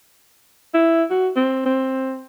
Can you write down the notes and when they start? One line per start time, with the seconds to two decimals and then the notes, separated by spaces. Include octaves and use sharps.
0.74 E4
1.11 F#4
1.36 C4
1.66 C4